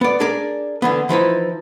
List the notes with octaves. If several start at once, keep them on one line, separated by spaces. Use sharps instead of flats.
B3 D5
D4 G#4 A#4 D5
D3 E3 B3
E3 F3 D#4 E4